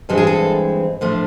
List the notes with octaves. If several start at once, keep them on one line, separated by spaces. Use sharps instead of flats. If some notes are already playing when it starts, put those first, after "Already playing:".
G2 E3 G#3 C4 A4
G#4
A4
A2 F3 A3 D4